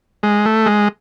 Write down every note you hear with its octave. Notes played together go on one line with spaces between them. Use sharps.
G#3
A3
G#3